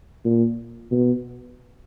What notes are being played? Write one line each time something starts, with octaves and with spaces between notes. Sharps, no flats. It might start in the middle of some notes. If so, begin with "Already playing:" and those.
A#2
B2